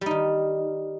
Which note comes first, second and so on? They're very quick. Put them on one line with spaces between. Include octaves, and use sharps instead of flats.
G3 D#4 D#3